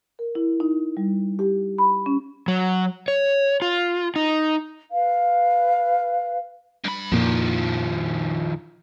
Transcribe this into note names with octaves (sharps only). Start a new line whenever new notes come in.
A#4
E4
D#4
G3
G4
B5
C#4
F#3
C#5
F4
D#4
B4 F5
G2 B5
F2 A#2 D#3 F3